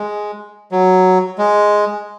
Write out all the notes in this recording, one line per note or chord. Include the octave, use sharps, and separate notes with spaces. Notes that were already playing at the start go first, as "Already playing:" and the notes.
Already playing: G#3
F#3
G#3